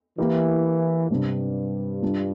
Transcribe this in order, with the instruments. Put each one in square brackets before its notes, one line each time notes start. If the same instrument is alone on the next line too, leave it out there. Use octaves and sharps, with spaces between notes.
[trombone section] E3 [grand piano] A#3 E4 G4 A#4
[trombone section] G2 [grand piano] C3 G3 D4
[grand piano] G3 D4 F4